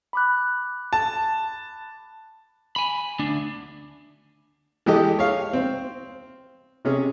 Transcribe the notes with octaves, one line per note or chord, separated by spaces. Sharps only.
B5 D6 F#6
A5
G#5 B5
D2 D4
E3 G#3 G4 A4 D#5
C#5 F5
C4
C3 C#4 G#4